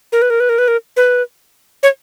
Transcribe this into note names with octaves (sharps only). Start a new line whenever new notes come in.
A#4
B4
A#4
B4
A#4
B4
A#4
B4
C#5